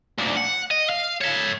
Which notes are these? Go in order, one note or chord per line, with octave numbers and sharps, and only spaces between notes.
D2 A#2
F#5
D#5
F5
C#5 E5